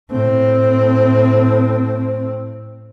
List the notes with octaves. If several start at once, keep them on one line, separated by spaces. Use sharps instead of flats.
A2 C4